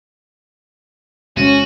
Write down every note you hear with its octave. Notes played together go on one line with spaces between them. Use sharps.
E2 C3 G#3 C#4 F#4 D#7